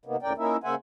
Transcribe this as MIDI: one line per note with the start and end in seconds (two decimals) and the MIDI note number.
0.05 0.16 48
0.05 0.16 51
0.05 0.16 58
0.05 0.16 59
0.22 0.33 39
0.22 0.33 45
0.22 0.33 49
0.22 0.33 70
0.22 0.33 74
0.22 0.33 79
0.38 0.57 58
0.38 0.57 61
0.38 0.57 63
0.38 0.57 64
0.38 0.57 70
0.38 0.57 76
0.64 0.75 49
0.64 0.75 58
0.64 0.75 72
0.64 0.75 76
0.64 0.75 78
0.64 0.75 80